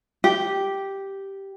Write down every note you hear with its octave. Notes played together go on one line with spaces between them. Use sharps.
G4